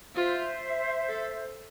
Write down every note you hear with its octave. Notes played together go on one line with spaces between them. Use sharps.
F4 C5 E5
A4